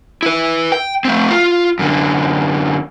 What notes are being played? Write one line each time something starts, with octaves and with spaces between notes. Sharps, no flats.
E4 B4
G5
A3 C4
F4
F#2 D3